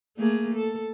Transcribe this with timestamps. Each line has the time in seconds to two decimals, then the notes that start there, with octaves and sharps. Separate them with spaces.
0.17 A3 A#3 G#4
0.54 A4